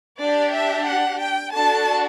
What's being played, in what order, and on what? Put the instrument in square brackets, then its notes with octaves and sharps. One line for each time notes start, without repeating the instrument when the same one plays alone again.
[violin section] D4 G4 D5
E5
F#5
G5
D4 F#4 A4 A5